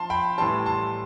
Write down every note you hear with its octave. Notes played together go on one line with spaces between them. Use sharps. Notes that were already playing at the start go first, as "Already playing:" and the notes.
Already playing: F3 A5 C6
G5 B5
A2 E3 G3 A5 C6
A5 C6